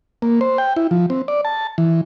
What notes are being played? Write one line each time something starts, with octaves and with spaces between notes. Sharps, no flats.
A#3
C5
G5
E4
F3
C4
D5
A5
E3